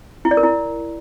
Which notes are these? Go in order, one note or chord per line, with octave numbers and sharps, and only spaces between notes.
E4
D5
A#4
E4